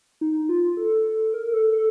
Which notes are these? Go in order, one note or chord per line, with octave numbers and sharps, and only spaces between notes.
D#4
F4
A4
A#4
A4
A4